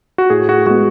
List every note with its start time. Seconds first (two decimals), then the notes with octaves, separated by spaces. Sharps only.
0.18 F#4
0.30 A2 G#4
0.49 F#4
0.67 G#3 B3 F#4